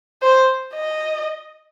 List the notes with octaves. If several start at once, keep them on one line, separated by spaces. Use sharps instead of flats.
C5
D#5